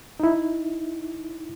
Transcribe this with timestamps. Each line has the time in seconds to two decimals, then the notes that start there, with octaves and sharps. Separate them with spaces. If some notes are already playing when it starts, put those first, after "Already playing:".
0.20 D#4 E4